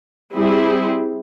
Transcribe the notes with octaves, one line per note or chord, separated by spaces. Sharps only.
G3 C4 E4 G#4